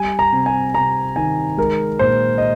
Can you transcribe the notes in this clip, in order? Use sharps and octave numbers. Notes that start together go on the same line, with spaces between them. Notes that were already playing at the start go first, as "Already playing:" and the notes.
Already playing: G3 G#5
A#5
C3
G#5
C3 A#5
D#3 G#5
G#3 A#4
A#2 C5
D#5